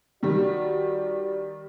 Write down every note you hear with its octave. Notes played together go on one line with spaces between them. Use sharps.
D#3 G3 F#4 D5